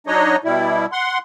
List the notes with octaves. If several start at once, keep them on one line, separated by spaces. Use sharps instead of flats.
F#3 D4 D#4 C#5 D#5
B2 G3 E4
F#5 C6